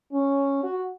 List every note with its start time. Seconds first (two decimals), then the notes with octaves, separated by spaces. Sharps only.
0.12 C#4
0.63 F#4